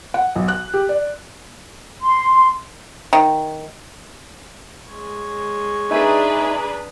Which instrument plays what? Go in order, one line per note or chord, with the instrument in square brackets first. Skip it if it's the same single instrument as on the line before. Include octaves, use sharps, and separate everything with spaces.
[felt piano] F#5
B1
F#6
G4
D5
[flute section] C6
[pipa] D#3
[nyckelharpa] G#3 C#5
[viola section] D4 G#4 B4 [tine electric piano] D#4 E5 G#5 [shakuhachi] A#5